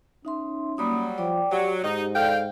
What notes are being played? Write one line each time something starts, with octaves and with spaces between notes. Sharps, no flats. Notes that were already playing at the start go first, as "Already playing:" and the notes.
C#4 D#4 E5 C6
F#3 G3 A#3 B5 D#6
F3 D5 G5 D6
F#3 G4 D5
G#2 D#4 G4
A4 D5 F5 G5